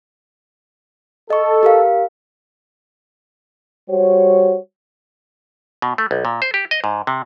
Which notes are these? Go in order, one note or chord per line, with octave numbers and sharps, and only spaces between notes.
A4 D#5 C#6
G4 A#4 F5
G3 F#4 C5 C#5
B2
A3
B1
A#2
C5
G4
D#5
G#2
C3